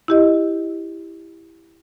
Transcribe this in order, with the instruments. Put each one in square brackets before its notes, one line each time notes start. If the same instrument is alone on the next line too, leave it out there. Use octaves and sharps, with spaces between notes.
[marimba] E4 G4 D#5